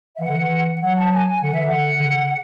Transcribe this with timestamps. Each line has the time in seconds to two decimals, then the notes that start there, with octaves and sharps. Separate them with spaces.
0.16 E5
0.20 E3 F#5
0.28 D3
0.36 E3
0.81 F#3 F#5
0.97 A5
1.12 G#5
1.28 G#5
1.41 D3 F#5
1.53 E3 E5
1.64 D3 F#5
2.00 D3
2.05 C#3